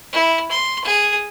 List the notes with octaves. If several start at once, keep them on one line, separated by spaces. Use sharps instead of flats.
E4
C6
G#4